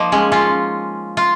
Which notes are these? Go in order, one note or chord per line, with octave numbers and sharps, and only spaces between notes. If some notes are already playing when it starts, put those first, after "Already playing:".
Already playing: F3 A#3 D#4
G#3 C#4
C#4 F4
F4